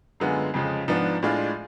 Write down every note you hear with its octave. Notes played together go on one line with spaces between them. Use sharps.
F#2 D3 G#3 B3 F4
F2 C#3 F3 G#3
G#2 F3 B3 D4
A2 G#3 D4 F4